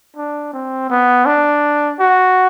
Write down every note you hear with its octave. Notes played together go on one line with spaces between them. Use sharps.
D4
C4
B3
D4
F#4